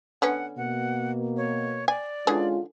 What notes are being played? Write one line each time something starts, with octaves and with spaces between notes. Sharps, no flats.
D3 B3 C#4 F#5
B2 A#3 F#5
C#5
D5 G#5
D3 E3 G#3 C#4 F4 G#4